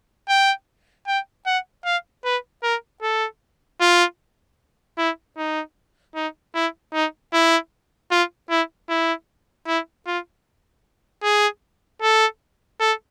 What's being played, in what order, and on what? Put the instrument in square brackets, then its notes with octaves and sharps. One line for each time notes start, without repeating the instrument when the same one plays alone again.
[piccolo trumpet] G5
G5
F#5
F5
B4
A#4
A4
F4
E4
D#4
D#4
E4
D#4
E4
F4
E4
E4
E4
F4
G#4
A4
A4